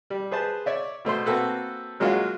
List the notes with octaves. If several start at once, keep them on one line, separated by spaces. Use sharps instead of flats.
G3
G#4 B4 C5 A5
C#5 D5 E5
B2 A3 C5 C6
A#3 C4 F#4 A4 B4
F#3 G#3 A#3 C#4 F4 F#4